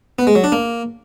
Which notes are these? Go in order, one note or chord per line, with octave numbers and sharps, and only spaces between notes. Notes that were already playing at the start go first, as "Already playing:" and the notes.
B3
G#3
F#3
D4
A#3